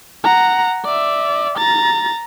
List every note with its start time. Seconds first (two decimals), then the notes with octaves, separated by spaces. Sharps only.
0.24 F#5 A#5
0.85 D5 E5
1.58 A#5 A6